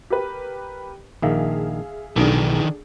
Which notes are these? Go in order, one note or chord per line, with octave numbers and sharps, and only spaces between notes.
G4 A#4 B4
A#1 D#3 G#4 E5 F5
B1 D#3 E3 D4 G#4 A4